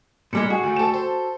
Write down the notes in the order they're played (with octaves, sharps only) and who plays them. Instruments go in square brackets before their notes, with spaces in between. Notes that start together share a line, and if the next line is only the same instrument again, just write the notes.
[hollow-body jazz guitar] A#2 G3 G#3 [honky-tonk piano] C#7
[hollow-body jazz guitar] F#4 [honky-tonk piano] G#4
[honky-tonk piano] D2
[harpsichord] D2 G4 [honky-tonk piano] A4 E7
[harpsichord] C5